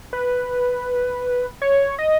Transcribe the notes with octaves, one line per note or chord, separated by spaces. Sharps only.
B4
C#5
D#5